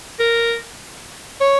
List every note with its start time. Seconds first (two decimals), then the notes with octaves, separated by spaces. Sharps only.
0.20 A#4
1.41 C#5